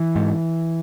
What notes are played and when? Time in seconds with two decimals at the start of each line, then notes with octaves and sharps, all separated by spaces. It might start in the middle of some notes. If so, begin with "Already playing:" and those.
Already playing: E3
0.16 G#2